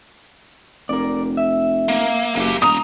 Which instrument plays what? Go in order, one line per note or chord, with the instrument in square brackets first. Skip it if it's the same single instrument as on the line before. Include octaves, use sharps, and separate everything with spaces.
[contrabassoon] F1 [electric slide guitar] A#4 D5
[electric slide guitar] E5
[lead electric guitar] A#3
[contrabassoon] F#1 [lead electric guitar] A#3 G4
[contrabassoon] E1 [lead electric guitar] C#3 A#5 [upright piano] D#6